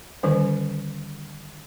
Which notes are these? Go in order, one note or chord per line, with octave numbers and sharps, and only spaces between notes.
D3 D#3 G3 C#4 C5